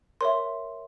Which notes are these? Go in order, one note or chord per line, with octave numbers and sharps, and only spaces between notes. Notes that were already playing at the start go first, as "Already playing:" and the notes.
A#4 C#5 E5 C6